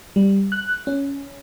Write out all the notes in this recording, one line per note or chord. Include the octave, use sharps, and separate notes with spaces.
G3
F#6
C#4